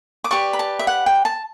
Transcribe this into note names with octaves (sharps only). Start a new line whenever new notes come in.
D6
G4 B4 D5 C#6
B5
A5
E5
F#5
G5
A5